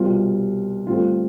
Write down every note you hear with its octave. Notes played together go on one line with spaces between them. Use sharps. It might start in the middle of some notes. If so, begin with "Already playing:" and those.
Already playing: C2 B2 G3 C4 F4
G2 D3 A3 C4 F4